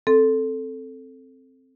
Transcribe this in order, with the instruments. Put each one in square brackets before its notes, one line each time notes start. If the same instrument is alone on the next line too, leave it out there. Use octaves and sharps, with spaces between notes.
[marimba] C4 A4